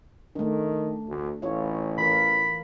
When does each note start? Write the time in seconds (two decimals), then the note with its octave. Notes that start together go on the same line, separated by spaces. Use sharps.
0.36 D#3 A3 D4
1.08 D2
1.42 A1 E4 F4 C#5
1.98 E3 F4 A#4 B5